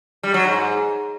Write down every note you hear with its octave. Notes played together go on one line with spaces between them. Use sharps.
G3
F#3
G#2